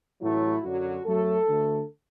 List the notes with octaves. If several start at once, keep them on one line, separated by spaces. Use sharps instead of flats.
A1 A2 F#3 A3 E4
F#2 D3 F#3 F#4
F#2 F#3 A3 A4
D2 D3 A3